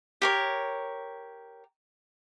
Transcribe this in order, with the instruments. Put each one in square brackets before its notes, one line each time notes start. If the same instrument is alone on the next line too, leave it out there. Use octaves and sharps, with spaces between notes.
[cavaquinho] G4 A#4 C#5